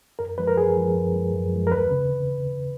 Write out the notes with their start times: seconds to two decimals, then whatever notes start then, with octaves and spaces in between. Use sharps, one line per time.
0.19 F#2 A#4
0.38 F3 G#3 B4
0.48 A#4
0.57 F#2 G#4
0.77 F3 G#3
0.95 F#2
1.15 F3 G#3
1.34 F#2
1.53 F3 G#3
1.67 A#4
1.72 D#2 B4
1.91 C#3